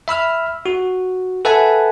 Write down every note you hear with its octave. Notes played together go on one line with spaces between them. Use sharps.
E5 B5 E6 F6
F#4
A4 B4 E5 F#5 G#5 A5